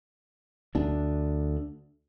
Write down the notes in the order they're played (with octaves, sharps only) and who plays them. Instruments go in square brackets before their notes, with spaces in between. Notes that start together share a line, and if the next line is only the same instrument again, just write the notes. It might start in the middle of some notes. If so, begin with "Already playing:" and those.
[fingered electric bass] D2 D4